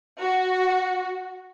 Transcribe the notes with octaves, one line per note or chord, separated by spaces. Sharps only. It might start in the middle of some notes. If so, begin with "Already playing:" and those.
F#4